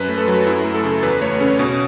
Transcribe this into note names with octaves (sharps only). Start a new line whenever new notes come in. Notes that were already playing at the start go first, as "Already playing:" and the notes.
Already playing: F#2 B4
A3
A4
F#3
F#2 E4
A3
A4
C#3
E2 B4
A3 C#5
C#3 C#4
B2 C#4